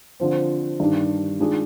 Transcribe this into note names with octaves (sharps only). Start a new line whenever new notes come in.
D3 F3 C4
G2 D#3 G3 D4
D#3 G#3 D4 F4 G#4